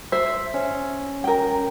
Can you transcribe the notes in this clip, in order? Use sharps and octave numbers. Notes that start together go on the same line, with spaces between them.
C5 E5
C#4
A#4 G5